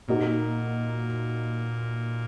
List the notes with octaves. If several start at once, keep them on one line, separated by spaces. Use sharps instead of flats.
A#2 A#3 D#4 F#4